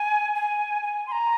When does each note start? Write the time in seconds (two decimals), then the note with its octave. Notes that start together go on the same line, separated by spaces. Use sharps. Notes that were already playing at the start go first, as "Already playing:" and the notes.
Already playing: G#5
0.35 G#5
0.83 G#5
1.07 C6
1.12 A#5